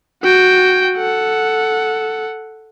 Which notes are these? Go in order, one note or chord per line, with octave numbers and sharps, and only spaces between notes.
F#4 G5
A4 F#5